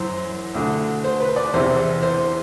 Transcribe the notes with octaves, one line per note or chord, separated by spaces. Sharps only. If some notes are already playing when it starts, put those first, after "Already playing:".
Already playing: F#2 E3 C5
D2 D3
C5
B4
D5
E2 C3 E3 C5
C5